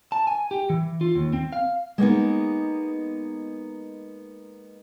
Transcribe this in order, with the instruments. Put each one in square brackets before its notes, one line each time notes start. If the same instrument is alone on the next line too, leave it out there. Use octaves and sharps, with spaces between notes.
[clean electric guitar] A5
G#5
G4
E3
F4
D#2
C4
F5
[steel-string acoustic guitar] G#3 A#3 B3 D#4